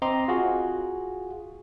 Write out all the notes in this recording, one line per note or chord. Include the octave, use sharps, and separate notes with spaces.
C4 D#5 A#5 C6 D6
F4 F#4 G#4